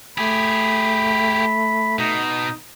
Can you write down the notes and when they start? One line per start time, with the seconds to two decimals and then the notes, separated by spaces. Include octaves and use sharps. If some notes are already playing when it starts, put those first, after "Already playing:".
0.18 A3 G4 G#4 B5
1.99 B2 D#4